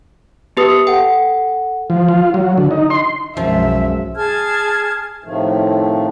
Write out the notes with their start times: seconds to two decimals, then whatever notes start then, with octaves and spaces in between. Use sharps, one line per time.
0.57 B3 G4 B4 A5 D#6 C#7
0.87 A4 F#5 G5
1.90 F3
2.08 F4
2.34 F#3
2.58 D3
2.71 D#4
2.90 C6
3.37 B1 F#2 F3 G#3 E5
4.15 G#4 A5 F6 G#6
5.24 A2 C3 D#3 F3 A3